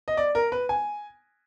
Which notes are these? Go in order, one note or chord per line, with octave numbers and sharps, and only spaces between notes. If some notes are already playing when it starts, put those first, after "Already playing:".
D#5
D5
A#4
B4
G#5